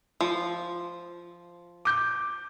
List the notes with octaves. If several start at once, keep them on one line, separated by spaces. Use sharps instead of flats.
F3
D6 G6